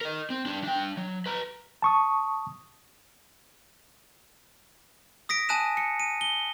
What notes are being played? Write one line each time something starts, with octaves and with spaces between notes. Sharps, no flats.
A#4 D#5
C4
G3 D4
D4 G5
F#3
B4 A#5
A5 C#6 D#6
D#6 A#6 B6 D7
G#5 A5 D#6 F#6 D#7 E7
C#7
D#7
G7